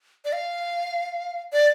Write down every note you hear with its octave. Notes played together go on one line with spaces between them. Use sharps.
D5
F5
D5